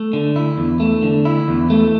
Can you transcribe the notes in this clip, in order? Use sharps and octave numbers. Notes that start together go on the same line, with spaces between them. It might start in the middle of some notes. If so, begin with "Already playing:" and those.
Already playing: A3
D3
E4
E2
A3
D3
E4
E2
A3